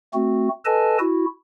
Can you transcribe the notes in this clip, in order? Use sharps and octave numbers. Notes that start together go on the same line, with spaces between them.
A3 C4 F#4
A4 B4 D#5 G#5 A5
E4 F#4